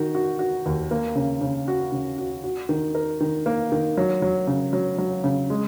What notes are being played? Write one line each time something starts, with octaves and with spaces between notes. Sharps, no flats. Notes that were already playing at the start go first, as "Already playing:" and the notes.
Already playing: D#3 F#4
F#4
F#4
D#2
A#3
C#3
C#3
F#4
C#3
F#4
F#4
D#3
A#4
D#3
A#3
D#3
F#3
F#3
C#3
F#3
F#3
C#3
G#3